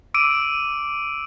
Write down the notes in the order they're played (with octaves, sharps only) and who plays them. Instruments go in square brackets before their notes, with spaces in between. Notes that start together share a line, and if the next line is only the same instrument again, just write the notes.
[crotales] D6 E6 D7 D#7